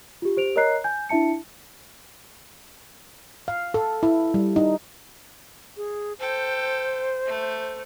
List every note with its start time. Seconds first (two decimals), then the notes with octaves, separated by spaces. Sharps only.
0.22 F4 G4
0.37 G4 C5 D7 F7
0.56 A#4 C#5 D#5 A#5 F#6 C7
0.84 G#5 G6
1.09 D4 E4 E5 A5 C#7
3.48 F5
3.74 A4
4.03 E4
4.34 G3
4.56 D#4
5.77 G#4
6.19 A4 C5 G5
7.26 A3